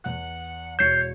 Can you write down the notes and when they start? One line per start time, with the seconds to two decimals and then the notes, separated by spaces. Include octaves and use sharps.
0.04 E2 F#5 F#6
0.79 E1 C#5 G6 C7 E7